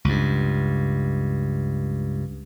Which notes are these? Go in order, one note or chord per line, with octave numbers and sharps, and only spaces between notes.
C#2 G2